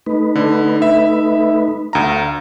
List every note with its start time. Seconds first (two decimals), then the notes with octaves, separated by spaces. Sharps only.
0.06 A3 D#4 B4
0.35 D3
0.82 E5
1.93 D2 F5 A#5